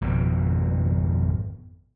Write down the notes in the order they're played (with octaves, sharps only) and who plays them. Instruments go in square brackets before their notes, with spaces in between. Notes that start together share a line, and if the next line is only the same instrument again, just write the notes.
[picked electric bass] G#1 F2 B2